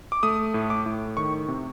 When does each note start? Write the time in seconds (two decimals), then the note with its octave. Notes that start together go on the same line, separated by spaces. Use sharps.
0.12 D6
0.23 A3 D#6
0.54 A2
0.70 D6
0.86 A2
1.17 D#3 C#6
1.48 C3